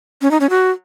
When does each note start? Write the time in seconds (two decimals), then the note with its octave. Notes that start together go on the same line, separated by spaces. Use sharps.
0.22 C#4
0.31 D#4
0.40 C#4
0.50 F#4